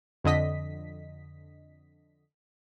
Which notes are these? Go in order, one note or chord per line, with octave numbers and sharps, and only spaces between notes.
F2 D3 D#5 B6